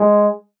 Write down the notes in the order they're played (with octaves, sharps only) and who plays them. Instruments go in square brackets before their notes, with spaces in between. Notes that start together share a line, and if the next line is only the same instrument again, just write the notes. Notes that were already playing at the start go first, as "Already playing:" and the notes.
Already playing: [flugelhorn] G#3